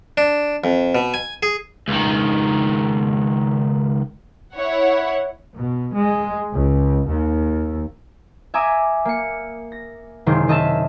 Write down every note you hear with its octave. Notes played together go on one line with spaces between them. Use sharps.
D4
F2
B2
G#5
G#4
C#2 D#3
E4 C#5 F#5
B2
G#3
C#2
D#2
E5 G#5 A#5 D6 D#6
A#3 C#7
A#6
F#1 C3 D#3 G#3 C6
D#3 D#5 E5 A5 E7